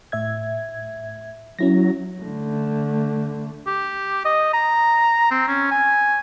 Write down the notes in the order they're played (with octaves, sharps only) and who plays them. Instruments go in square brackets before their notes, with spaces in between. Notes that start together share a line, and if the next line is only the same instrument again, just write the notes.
[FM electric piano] A2 E5 G#6
[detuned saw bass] F#3 [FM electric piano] C#4 E4 A#6
[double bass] D3 A3
[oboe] G4
D#5
A#5
C4
C#4
G#5